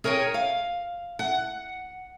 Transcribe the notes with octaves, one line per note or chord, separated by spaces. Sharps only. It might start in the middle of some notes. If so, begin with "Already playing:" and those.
G#4 A#4 C#5 G5 G#5
F5
F#5